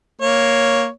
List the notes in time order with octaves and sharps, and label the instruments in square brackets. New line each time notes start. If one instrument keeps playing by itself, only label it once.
[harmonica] A#3 C#5